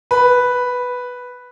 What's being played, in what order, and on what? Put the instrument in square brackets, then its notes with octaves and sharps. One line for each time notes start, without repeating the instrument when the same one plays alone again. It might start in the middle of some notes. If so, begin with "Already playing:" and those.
[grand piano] B4